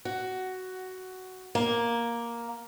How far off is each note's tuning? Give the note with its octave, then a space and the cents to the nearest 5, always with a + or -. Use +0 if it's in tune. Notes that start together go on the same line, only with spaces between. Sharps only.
F#4 +10
A#3 +5